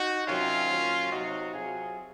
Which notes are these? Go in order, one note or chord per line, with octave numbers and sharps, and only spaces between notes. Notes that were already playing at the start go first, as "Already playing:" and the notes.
Already playing: D#4 F#4
C3 D#3 F#3 C#4 F4
A#2 F#3
C3 F#3 D#4 F#4
C3 F#3 F4 G#4